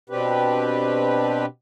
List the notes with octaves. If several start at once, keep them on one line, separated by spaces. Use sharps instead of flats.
B2 C4 D4 G4 B4